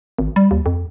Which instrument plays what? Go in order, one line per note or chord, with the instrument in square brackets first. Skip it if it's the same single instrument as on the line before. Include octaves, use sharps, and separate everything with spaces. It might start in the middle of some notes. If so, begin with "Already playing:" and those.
[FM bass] G#1
G3
D#2
F2